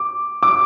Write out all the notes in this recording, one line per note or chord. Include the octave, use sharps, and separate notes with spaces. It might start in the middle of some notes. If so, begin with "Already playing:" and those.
Already playing: D6
D6